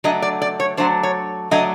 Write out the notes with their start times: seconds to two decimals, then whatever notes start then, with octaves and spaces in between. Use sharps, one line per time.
0.04 F#3 A3 D4 D#5
0.22 D5
0.42 D5
0.60 C#5
0.77 F#3 A3 D4 C5
1.03 C#5
1.51 F#3 A3 D4 D#5